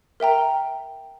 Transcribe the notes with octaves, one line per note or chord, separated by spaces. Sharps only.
A#4 E5 G5 A#5